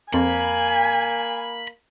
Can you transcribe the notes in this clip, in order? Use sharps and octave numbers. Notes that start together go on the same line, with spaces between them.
F2 A#3 G#5 B5